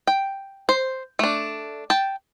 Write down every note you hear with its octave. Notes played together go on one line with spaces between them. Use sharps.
G5
C5
A3 D4
G5 A5